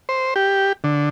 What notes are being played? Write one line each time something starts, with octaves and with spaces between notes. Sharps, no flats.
C5
G4
D3